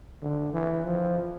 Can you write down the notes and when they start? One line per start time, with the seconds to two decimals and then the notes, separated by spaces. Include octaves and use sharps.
0.22 D3
0.53 E3
0.85 F3